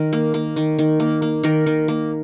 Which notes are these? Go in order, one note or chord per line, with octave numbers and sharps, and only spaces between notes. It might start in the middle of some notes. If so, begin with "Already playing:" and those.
Already playing: D#3 A#4
A#3
A#3
D#3
D#3
A#3
A#3
D#3 A#4
D#3
A#3